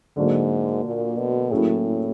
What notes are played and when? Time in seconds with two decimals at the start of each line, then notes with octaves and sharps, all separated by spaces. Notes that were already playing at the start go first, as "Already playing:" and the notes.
0.16 G#2 D3 F#3 A#3
0.84 A#2
1.18 B2
1.51 A2 F#3 A#3 C#4 E4 G#4